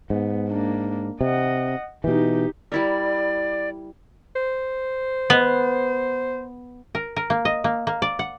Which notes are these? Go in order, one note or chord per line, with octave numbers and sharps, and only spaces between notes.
G#2 B3
A#3 D4
C3 D#5 F#5
B2 E3 D#4 G4
G3 E4 A#4 D5
C5
B3
A#4
A#4
A#3
D#5
A#3
A#3
D5
F#5